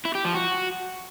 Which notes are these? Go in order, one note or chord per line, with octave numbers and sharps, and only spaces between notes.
E4
G4
F3
F#4